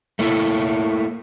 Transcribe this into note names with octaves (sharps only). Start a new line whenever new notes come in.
A3 A#3 E4